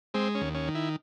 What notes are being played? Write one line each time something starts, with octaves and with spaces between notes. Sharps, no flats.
G#3 C4
C#4
D#2
C#4
D#3
E4